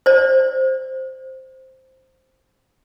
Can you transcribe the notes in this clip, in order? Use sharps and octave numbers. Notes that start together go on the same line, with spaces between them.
C5 D5